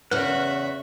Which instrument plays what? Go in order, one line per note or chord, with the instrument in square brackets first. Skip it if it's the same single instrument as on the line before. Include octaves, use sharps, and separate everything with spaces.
[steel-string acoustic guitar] E2 C#3 [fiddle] F#4 E5 [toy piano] B4 [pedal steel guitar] F#5